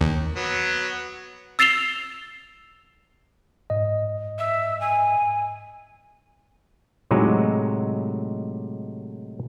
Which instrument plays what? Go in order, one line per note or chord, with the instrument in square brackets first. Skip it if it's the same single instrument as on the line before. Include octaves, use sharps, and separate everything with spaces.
[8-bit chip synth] D#2
[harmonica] F#3 B3
[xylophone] E6 A6 C7 E7 F7 G7
[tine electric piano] G#2 D#5
[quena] E5
G#5
[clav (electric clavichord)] A2 C3 F#3 G#3 D#4 G#5